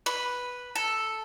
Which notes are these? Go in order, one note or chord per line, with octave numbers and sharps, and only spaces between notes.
B4
A4